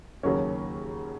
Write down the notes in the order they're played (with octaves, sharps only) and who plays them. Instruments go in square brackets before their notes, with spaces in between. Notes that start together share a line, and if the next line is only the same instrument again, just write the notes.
[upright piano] D#2 C#3 F#3 A#3 C#4